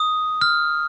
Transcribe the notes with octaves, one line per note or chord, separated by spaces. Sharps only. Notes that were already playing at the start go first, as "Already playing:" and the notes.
Already playing: D#6
F6